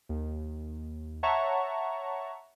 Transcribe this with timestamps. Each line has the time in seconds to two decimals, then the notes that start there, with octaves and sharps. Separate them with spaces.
0.09 D#2
1.23 C#5 E5 F#5 A5 A#5 C#6